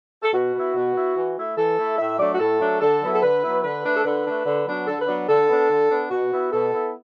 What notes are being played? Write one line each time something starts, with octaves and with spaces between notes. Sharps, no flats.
A4
B2 F#4
B3 E4
B2
B3 E4
E3
A3 E4
E3 A4
A3 E4
A2 E5
F#3 A3 D4 D5
F#4
A2 A4
F#3 A3 D4
D3 A4
F#3 B3 E4
A4
D3 B4
F#3 B3 E4
D3 B4
A3 D4
A4
D3 B4
A3 D4
D3
F#3 B3 D4
D3 A4
B4
F#3 B3 D4
D3 A4
B3 D4
D3
B3 D4
B2 F#4
B3 E4
B2 A4
B3 E4